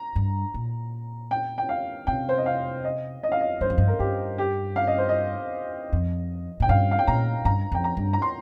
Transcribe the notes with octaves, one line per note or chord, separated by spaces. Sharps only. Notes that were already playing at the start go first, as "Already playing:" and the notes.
Already playing: A#5
G2
A#2
G5
G5
F5
C3 G5
C5
D#5
F5
D#5
D#5
F5
D#5
G2 C5
F2
G2
A#4
G2 G4
G4
F5
D#5
C5
D#5
F2
A#2 G5
G2 F5
F5
G5
A#2 A#5
G2 A#5
F2 G5
A#5
G2
A#5
C6